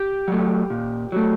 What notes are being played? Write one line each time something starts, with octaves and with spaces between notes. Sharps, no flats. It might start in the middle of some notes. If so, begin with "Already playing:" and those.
Already playing: G4
F#3 A3
A#2
F#3 A3